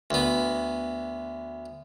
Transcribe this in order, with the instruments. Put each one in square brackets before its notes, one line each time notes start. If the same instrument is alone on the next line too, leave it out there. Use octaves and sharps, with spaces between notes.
[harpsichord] D2 B3